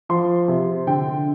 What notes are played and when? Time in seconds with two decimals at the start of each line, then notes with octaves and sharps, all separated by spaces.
0.09 F3 C6
0.48 C3
0.87 D3 G5